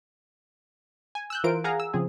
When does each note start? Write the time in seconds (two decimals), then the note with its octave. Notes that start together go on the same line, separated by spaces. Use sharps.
1.15 G#5
1.30 E6 F#6 G6
1.44 E3 F4 A#4 C5 D7
1.64 G#4 F5 F#5 G#5 A#5
1.80 E6
1.94 C#3 F3 C4 G#4